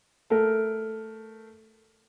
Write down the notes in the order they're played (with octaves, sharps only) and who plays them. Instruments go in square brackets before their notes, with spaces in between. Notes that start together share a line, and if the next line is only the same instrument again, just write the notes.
[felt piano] A3 A#4